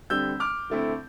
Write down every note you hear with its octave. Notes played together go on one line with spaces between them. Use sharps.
D3 G3 C4 E6 G6
D6 F6
D3 A3 C4 E4